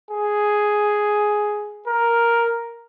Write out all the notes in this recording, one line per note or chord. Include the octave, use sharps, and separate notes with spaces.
G#4
A#4